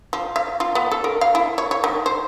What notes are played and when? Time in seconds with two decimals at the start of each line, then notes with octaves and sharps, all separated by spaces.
0.13 F3
0.36 F5
0.60 F4
0.75 B3
0.91 A4
1.04 A#4
1.21 F5
1.35 E4
1.58 C#5
1.71 C#5
1.84 D#3
2.06 C5